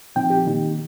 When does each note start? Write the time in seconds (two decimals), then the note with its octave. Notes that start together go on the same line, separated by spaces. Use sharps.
0.16 A#2 F3 C4 D#4 G5
0.30 G4
0.46 D#3 A#3 D#4